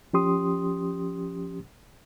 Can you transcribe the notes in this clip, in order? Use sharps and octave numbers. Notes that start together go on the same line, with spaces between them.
F3 C#4 G4 C6 D#6